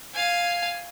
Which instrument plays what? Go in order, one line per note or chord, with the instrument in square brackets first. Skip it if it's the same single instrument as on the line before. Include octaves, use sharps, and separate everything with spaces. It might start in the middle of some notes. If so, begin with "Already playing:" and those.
[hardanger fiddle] F5 G#5